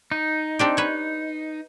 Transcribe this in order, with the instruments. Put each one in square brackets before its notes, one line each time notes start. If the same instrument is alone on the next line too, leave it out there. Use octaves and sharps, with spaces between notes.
[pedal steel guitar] D#4
[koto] C4 D4 G4
B4 C#5